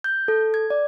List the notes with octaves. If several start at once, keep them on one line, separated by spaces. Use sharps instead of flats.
G6
A4
G#6
D5